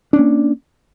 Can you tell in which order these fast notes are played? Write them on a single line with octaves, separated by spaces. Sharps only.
D4 C#4 A#3